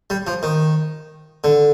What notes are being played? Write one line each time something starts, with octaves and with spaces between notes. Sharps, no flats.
G3
F3
D#3
D3